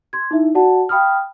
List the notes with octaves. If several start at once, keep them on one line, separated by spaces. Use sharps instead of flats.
C6 G#6
D#4 E4 E5
F#4 D5 F#5 A5
F5 G5 B5 D#6 F6